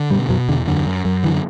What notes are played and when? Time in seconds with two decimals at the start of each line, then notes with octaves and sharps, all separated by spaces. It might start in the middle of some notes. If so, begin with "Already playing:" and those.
Already playing: D3
0.10 G2 B2 G3
0.29 F#2 B2 F#3
0.48 E2 D3
0.67 F#2 D3
0.86 F#2
1.05 F#2
1.24 D3 E3